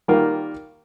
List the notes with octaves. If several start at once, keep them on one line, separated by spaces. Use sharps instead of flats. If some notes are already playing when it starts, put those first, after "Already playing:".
D#3 G3 A#3 F4 A#4